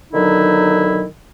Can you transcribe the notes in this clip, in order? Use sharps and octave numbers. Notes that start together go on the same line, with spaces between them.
B2 D3 D#3 F#3 D#4 E4